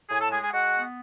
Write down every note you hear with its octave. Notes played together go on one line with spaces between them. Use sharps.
A2 G#4 G#5
A4 A5
G#3 G#4 G#5
G#4 G#5
G#3 F#4 F#5
B3